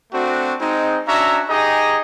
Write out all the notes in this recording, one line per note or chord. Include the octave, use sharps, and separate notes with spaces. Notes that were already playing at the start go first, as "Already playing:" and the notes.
A3 C4 D4 F#4
G#3 C4 D#4
C#4 D4 F#4 E5 A#5
D#4 G4 G#4 D#5 A#5